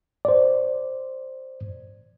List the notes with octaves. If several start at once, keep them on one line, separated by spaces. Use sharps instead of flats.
C5 D5